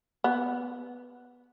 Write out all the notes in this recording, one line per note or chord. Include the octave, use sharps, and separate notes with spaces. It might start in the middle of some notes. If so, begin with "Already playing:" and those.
B3